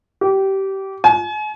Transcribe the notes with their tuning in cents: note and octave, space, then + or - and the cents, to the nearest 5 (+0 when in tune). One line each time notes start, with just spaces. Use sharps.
G4 -20
G#5 +40